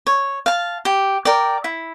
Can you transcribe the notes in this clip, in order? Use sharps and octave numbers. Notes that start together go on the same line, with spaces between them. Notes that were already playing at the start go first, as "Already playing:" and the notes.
C#5
F5 A5
G4
A#4 D5 G5
E4